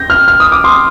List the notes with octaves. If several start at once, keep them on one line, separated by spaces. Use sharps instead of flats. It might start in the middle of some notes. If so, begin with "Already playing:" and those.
Already playing: G6 A#6
F6
F6
D#6
D6
C6